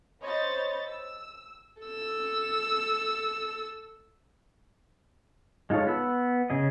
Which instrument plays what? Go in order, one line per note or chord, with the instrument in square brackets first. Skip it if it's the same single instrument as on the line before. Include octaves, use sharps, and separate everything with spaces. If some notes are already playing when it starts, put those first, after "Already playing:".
[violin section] C5 C#5 D#5 B5 G6 A6
E6
[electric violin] A4 E6
[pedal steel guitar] G#3 D#4 F4 A4 C#5
B3 B4 B5 E6
C#3 G#4 D#5